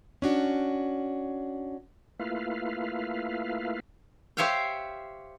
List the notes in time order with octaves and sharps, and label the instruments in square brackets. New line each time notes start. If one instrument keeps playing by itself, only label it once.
[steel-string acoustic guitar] C#4 D4 F#4
[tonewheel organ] A3 A#3 E4 F4 B4 F5
[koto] G4 C5 C#5 E5 F5 G5